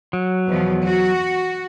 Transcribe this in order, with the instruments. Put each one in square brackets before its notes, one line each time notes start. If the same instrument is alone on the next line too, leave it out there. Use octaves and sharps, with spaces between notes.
[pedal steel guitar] F#3
[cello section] E2 B2 F3
F#4